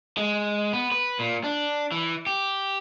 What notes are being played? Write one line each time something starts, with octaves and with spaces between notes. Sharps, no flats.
G#3
B3
B4
A#2
D4
E3
G4